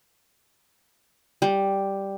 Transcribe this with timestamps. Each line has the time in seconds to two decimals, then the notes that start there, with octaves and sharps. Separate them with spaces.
1.42 G3